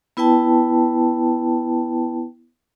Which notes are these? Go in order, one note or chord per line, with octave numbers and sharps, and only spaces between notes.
B3 E4 B4 G5 A5